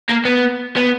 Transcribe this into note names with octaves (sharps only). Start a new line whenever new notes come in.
A#3
B3
B3